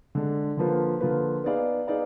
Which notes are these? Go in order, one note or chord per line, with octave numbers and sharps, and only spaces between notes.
D3 G#3 D4
D3 F3 A#3 F4 B4
D3 F3 A#3 F4 B4
B3 D#4 G#4 D5 F5
B3 D#4 G#4 D5 F5